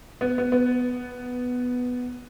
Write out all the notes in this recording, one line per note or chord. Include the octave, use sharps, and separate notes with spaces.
B3
B3
B3